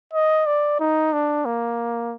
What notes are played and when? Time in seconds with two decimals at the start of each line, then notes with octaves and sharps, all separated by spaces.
0.13 D#5
0.46 D5
0.80 D#4
1.13 D4
1.46 A#3